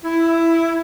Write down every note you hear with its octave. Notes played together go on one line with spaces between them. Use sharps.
E4